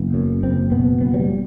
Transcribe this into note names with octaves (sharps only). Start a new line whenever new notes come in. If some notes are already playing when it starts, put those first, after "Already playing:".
Already playing: F#1 B3
F#2
F#1 C4
B2 B3
F#1 B3
F#3
G3